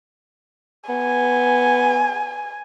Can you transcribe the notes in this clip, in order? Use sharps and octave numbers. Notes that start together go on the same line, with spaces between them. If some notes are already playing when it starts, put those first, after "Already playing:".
B3 G#5